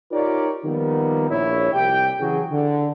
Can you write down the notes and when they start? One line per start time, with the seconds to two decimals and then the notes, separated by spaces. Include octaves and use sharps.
0.12 D#4 F4 G4 A#4 C#5 D5
0.65 D#3 F3 G3 A#3 B3
1.30 A#1 E4 C#5
1.73 C2 G4 G5
2.20 C#3 E3 F#3 F#4 G#4
2.51 D3